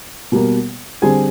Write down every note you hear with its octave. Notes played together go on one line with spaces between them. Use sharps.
B2 G3 A#3
D3 G3 C4 G#4 G#5